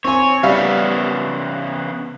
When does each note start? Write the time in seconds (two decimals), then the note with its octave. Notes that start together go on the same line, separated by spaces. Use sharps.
0.05 C4 C#5 G#5
0.43 C#3 G3 B3 E5 F5